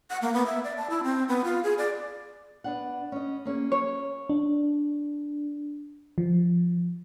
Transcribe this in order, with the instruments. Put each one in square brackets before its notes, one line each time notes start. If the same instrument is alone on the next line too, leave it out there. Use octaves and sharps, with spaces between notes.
[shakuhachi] F#5
A#3
B3
E5
D5
A5
E4
C4
B3
F4
G#4
D5
[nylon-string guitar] B3 D4 F#5
C#4 D#5
A#3 C#4 G#4
[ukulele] C#5
[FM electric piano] D4
F3